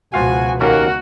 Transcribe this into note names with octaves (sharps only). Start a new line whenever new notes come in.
C#2 B2 F3 F4 F#4 F5 G#5
D#2 A#3 C#4 F#4 A#4